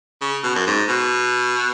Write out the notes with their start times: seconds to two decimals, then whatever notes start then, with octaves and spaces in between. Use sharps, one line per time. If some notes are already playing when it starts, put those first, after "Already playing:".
0.22 C#3
0.44 B2
0.55 F#2
0.67 G#2
0.88 B2